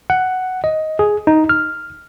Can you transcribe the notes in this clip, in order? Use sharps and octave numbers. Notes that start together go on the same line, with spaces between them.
F#5
D#5
G#4
D#4
F6